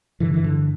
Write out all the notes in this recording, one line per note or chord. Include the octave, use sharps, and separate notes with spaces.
G2 D3 E3
E3
D3